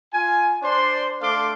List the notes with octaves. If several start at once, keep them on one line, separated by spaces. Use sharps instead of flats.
F4 G#5
D4 C5 D5 C6
A3 D4 A4 F5 C6 D6